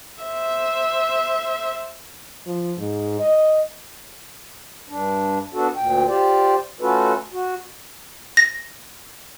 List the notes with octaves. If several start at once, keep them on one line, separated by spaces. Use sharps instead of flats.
C5 E5
F3
G#2
D#5
G2 D4
B3 D4 F#4 A4
D2 A#2 G5
F4 G4 C5 D5
A3 C#4 F4 F#4 A4 B4
F#4
A#6